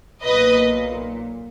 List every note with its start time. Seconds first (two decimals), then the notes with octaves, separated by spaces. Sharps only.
0.22 B1 A#2 B4 D#5